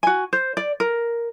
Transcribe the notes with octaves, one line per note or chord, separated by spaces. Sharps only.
F#4 G#5
C5
D5
A#4